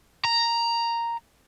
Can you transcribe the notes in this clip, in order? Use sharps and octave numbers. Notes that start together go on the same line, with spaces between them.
A#5